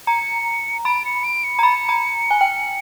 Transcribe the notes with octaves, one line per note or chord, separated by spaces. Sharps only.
A#5 C#7
B5 D7
C#7
D7
C#7
A#5
B5
A#5
G#5
G5